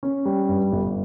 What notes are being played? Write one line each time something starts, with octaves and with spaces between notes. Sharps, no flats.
C#4
G3
G2
G1